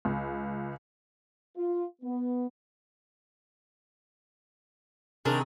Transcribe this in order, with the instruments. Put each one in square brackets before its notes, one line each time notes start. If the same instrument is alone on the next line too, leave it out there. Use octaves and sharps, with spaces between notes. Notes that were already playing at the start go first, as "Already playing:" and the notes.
[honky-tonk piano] C#2
[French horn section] F4
B3
[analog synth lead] C3 [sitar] D#3 G#4 [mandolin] D4 A#4